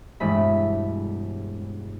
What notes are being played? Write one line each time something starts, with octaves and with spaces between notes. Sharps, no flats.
E1 G2 G#3 A3 B5